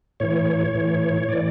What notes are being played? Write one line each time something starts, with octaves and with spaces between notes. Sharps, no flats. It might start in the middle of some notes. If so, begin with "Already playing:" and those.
A2 E3 C#5
A2 E3
A2 E3 D5